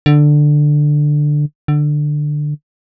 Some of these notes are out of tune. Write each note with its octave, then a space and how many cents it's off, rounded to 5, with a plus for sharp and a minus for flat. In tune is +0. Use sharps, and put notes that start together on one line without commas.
D3 +10
D3 +15